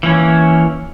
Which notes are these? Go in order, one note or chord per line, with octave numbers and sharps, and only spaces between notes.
E3 A#3 C#4 C#5